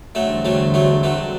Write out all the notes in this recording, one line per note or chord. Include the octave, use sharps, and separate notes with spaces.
E2 D3 F#3 G3 A3 C4
F#3 A3
F#3 A3
F#3 A3